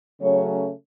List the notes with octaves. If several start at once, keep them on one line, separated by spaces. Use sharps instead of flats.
C#3 F#3 A3 C#4 C#5